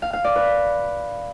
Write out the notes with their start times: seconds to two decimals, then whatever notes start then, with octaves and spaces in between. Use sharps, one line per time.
0.02 F5
0.13 F5
0.24 D5
0.36 B4